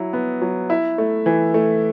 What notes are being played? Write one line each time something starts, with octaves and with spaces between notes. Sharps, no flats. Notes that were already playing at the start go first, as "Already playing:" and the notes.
Already playing: F#3 E4
B3
F#3
E4
A3
E3
A3